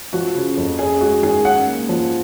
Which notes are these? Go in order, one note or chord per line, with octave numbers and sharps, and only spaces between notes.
F3 F#4
C#3
F2
C#4 G#4
G#3 F#4
D#3 G#4
C#4 F#5
A#3
F3